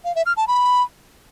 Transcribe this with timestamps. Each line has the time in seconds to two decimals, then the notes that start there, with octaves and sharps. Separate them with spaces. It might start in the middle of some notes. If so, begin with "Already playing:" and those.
0.05 F5
0.15 E5
0.26 F6
0.37 A5
0.48 B5